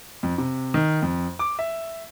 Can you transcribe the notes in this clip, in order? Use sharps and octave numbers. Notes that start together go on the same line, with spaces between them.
F2
C3
D#3
F2
D6
E5